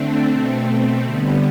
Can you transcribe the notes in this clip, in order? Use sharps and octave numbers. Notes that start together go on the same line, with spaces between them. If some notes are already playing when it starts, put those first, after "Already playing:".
Already playing: D3 A3 C4 D4
B2 A3 C4
D3 G3 B3